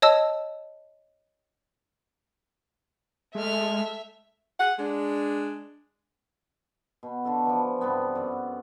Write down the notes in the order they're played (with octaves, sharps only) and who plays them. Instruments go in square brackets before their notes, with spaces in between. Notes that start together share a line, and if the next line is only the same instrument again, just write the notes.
[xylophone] C#5 D#5 A5 E6
[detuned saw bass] G#3 [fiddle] A3 F6 [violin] E5
[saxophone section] G#4 F#5
G#3 D4
[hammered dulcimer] B2
D3 F#4 A4
E3 F3
G2 C3 B3 G5
F#2 D5